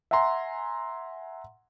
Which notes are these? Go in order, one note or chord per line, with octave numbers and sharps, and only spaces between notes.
E5 F#5 G#5 A#5 C6